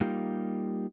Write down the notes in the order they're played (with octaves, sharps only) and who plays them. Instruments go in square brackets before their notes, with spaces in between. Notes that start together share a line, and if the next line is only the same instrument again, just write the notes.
[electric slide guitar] G3 A#3 D#4 F4 G4